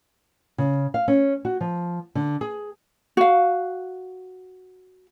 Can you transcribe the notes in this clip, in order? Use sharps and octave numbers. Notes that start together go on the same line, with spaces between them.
C#3
F5
C#4
F#4
F3
D3
G#4
F#4 F5